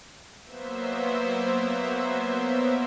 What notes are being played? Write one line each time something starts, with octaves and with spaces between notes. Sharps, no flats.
F#3 A#3 B3 C5 E5